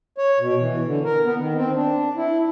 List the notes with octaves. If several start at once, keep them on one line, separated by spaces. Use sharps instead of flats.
C#5
B2
E3
D3
A#4
B3
D#3
C4
D4
E4